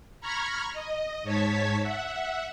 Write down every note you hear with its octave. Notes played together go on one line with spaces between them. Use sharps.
A#5 B5 C#6 F6 G#6 A#6
D#5
G#2 C#5 A5 G#6 B6
E5 F#5